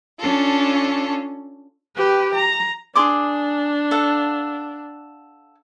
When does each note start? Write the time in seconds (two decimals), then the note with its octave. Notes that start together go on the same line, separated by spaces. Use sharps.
0.19 C#4 D4 F4 A4
1.97 G4 B4
2.36 A#5
2.96 D4 G#4 C6 D6
3.91 A4 F5 F#5